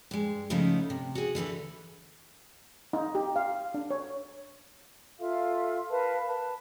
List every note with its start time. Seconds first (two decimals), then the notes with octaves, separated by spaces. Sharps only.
0.11 G2 G#3
0.50 C#3 F3 A3 B3 D#4 E4
0.90 C3
1.15 F#4 G#4
1.35 D3 E3 A4 B4
2.93 D#4
3.15 G4
3.36 F5
3.74 D4
3.91 C#5
5.20 F4 A4 E5 F5
5.90 A#4 B4 F5 A5
6.28 B4 A5